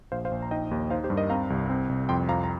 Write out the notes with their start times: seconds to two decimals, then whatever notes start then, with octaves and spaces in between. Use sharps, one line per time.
0.12 A#1 C5 F5
0.25 C5 F5
0.31 A#1
0.42 A#5
0.51 D#4 D#5 G5
0.71 D#2
0.90 D#4 C5 F5
1.04 G4 C5
1.10 G2
1.16 A#4 D#5
1.30 C4 F5 A#5
1.50 C2
1.69 C4
1.89 C2
2.09 F2 G5 C6
2.29 F2 F5 A#5
2.44 A#5